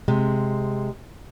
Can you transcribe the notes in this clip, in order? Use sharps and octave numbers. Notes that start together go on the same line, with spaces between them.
C3 G#3